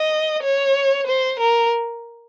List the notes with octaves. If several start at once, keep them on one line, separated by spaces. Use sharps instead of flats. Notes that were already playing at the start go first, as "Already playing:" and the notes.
Already playing: D#5
C#5
C5
A#4